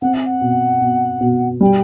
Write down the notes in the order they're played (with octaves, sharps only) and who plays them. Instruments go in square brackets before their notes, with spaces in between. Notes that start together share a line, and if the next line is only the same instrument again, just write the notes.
[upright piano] C4 [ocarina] F#5
[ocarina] E5
F#5
[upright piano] B2
B2
B2
[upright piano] G3 [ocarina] G5